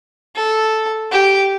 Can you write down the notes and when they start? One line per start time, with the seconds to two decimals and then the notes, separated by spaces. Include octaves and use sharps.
0.36 A4
1.11 G4